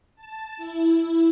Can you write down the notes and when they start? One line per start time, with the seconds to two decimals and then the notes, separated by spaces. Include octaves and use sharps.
0.15 A5
0.57 E4